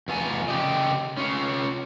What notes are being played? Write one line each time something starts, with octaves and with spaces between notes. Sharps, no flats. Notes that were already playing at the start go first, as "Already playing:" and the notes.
E2 F4 G#5
C#3 G4 D5 D#5
C#4 F4